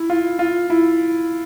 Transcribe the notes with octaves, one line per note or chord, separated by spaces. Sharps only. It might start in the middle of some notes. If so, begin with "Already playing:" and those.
Already playing: E4
F4
F4
E4